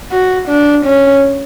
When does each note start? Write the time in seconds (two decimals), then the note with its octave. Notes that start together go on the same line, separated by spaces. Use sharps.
0.11 F#4
0.48 D4
0.85 C#4